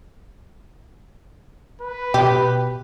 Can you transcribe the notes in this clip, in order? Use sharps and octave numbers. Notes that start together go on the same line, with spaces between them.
B4
B2 G4